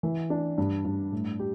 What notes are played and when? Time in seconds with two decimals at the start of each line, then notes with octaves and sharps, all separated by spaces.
0.03 E3
0.30 D4
0.58 G2
0.85 G2
1.12 A2
1.40 G4